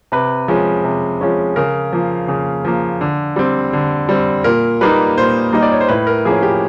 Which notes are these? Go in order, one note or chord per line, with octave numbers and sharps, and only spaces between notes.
C3 B4
F3 G#3 C#4
C3
F3 G#3 C#4
C#3 A#4
F3 A#3
C#3
F3 A#3
D3
G3 C4
D3
G3 C4
A#2 A#4
G3 A#3 D#4 B4
A#2 C5
G3 A#3 D#4 D#5
D5
C#5
C5
A2 B4
A#4
F3 A#3 C#4 G#4
G4